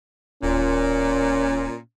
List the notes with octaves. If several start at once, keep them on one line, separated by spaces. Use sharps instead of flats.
D1 A#2 C#4